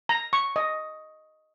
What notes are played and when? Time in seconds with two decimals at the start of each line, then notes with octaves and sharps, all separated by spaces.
0.09 A#5
0.33 C#6
0.56 D#5